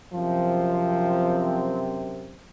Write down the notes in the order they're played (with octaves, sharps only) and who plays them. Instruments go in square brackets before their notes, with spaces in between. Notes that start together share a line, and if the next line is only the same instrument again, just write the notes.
[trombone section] F#2 C3 C4 [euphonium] F3